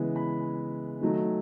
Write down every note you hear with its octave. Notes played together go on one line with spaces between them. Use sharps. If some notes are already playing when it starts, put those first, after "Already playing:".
Already playing: C#3 E3 G#3 B3 E4
B5
D#3 F#3 A3 D#4